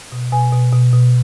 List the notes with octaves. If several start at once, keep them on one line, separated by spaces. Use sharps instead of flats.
B2
B2 G#5
B2
B2
B2